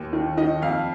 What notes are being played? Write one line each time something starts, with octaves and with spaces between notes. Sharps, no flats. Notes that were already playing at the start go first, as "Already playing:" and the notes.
Already playing: D#2
D#3
D#3 D#5
F2 F5